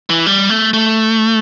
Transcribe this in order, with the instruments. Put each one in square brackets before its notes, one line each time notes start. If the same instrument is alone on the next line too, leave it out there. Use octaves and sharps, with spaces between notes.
[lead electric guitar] E3
G3
A3
A3